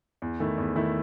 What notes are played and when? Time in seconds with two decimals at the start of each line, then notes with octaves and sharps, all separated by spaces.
0.22 E2
0.40 D#3 A3 E4
0.58 E2
0.76 D#3 A3 E4